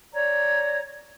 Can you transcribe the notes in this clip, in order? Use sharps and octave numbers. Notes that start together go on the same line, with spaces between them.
C#5 D5 A#5